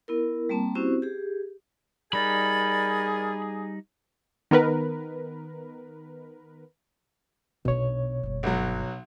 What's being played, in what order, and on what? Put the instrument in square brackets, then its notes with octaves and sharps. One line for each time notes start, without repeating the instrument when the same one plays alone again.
[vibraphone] B3 E4 A#4
G3 A#3 C4 A5
C4 C#4 E4 F#4 G4 C5
G4 G#4
[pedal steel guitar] G3 D#4 [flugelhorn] G#4 [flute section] A#4 D5 G#6 [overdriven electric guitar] B5
[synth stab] D#3 B3 A#4 B4
[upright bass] B1 D4 [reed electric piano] B2 C#5
[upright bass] F#1 G2
[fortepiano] B1 F#3